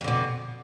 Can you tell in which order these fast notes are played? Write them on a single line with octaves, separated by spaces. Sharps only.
F2 D3 B2